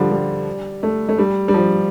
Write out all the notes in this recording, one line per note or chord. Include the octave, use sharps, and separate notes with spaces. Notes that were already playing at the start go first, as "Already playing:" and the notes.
Already playing: D3 F3 G3
G3
A3
A3
G3
G3
F3